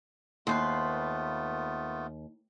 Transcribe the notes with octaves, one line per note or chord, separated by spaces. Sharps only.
D#2 A3 B3 F4 B4 C5 C6